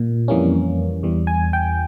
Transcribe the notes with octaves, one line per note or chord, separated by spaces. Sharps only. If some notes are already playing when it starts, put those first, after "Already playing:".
Already playing: A#2
F2 E3 G3 A#3 C#4
E2 E3 G3
G#5
G5